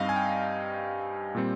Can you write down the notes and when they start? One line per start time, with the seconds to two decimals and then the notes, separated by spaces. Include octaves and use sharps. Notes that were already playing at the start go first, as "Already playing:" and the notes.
Already playing: G2 G3 C4 D#4 D#5 F5
0.09 G#5
0.16 G5
1.35 A#2 G3 C4